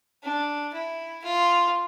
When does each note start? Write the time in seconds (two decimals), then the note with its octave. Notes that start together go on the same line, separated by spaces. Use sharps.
0.23 D4
0.73 E4
1.23 F4